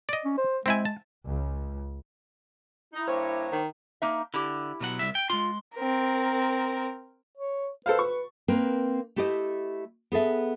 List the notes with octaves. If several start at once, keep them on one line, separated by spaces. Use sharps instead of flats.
D5 D#5
C#4
C5
G#3 C4 E4 G#5
A5
C#2
D#4 E4
G2 A#3 C5 C#5
D#3
A#3 D#4 E5
D3 E4 G4
B2 F#3 F#5
C2 E5
G5
G#3 F4 C6
C4 A#4
C#5
A4 B4 C5 F5
C#6
A#3 C4 A#4 B4
A3 E4 G4 C5 D#5
B3 G#4 A4 E5